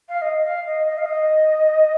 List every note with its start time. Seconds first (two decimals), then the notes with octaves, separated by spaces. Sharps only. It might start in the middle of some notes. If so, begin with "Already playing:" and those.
0.08 F5
0.21 D#5
0.44 F5
0.66 D#5
0.89 D#5
0.97 F5
1.05 D#5